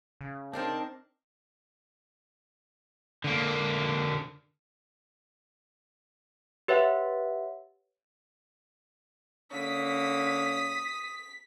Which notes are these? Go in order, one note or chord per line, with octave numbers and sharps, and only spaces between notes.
C#3
C4 D4 D#4 A#4 C5 A5
D3 A#3
G4 B4 C#5 E5 F#5
D3 A#3 C#4 D#6 B6